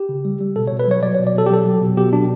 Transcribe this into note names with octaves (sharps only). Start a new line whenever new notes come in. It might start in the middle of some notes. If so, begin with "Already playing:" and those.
Already playing: G4
C#3
G3
G3
B2 A4
C#5
B2
B4
F#3 C#5
F#3 D5
C#5
B2
D5
B2 A4
G4
F#3 A4
F#3
B2
B2 G4
F#3 D4